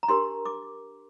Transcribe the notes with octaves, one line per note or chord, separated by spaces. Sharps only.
A#5
D4 G4 A#4 C6
D6